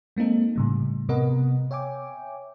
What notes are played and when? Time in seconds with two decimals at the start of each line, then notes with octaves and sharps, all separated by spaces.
0.16 G#3 A#3 C4 D#4 A4
0.56 A2 C#3 G3
1.09 C3 B3 A#4 D#5 F#5
1.71 C#5 E5 G5 G#5 D6